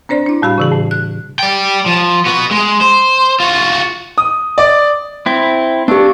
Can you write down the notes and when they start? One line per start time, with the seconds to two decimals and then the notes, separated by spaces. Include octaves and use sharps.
0.09 C4 D4 C5 D5
0.26 D4 E4
0.42 A2 G3 F#4 B5
0.58 C#3 E3 G#4
0.71 A2
0.91 F#6
1.39 D5 G5
1.86 F3
2.26 B3 F#4
2.51 G#3
2.81 C5
3.40 F4 F#4
4.18 D#6
4.58 D5
5.26 C4 E4
5.88 B3 D4 G4